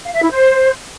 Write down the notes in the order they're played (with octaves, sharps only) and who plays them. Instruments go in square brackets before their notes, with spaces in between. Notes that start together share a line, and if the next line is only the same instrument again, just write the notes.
[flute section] F5
E5
E4
C5